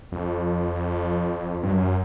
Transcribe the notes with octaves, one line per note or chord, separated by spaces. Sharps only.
F2
G2
F#2